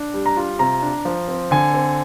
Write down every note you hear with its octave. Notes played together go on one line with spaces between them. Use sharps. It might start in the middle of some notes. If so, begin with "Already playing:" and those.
Already playing: D4
G3
A#5
F4
C3 A#5
D4
F3
C4
D3 G#5
C4